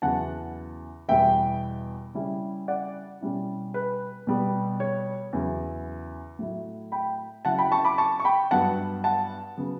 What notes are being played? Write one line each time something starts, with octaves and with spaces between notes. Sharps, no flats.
E2 C#3 F#3 F#5 A5
E2 B2 G3 E5 G5
C#3 G3 C#4 E4
D5 F#5
B2 G3 C#4 E4
B4
B2 G3 B3
C#5
E2 C#3 F#3
A2 F#3 A3 E4
G5 B5
C#3 F#3 C#4 E4 F#5 A5
G5 B5
A5 C#6
B5 D6
A5 C#6
C#6
G5 B5
G2 F#3 B3 F#5 A5
F#5 A5
C#3 F#3 B3